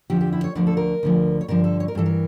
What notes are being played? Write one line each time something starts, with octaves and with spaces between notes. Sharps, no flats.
F2 D3 F3 G4
G4
E4
C#5
D2 D3 F3 A#4
A4
A#4
D2 D3 F3
C#5
G2 D3 F3 A#4
A4
C#5
A#4
G2 E3 A4
A#4